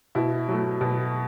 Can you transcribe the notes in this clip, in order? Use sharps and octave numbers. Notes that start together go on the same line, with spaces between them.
B2 E4
F#3 A3
B2